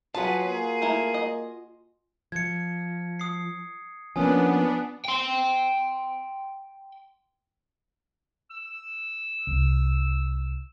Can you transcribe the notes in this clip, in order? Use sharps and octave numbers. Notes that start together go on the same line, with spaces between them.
F#3 F4 F#4 G#4 B4 F#5 A5
A#3 G#4
A3 E4 A#4
D#5
F3 G#6 C#7
D#6 C7
F3 A#3 B3 C#4 D4 G#5 D#6
G5 C6
E6
C2